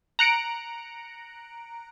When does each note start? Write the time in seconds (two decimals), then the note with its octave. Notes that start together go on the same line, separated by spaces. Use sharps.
0.19 A#5 F#6 C#7 D7